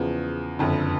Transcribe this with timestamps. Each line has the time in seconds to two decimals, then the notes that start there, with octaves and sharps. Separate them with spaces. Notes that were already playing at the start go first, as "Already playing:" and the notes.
Already playing: E2 C#3 F3
0.59 F#1 F2 D3